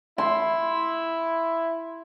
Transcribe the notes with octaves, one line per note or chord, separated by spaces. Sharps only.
E4 C6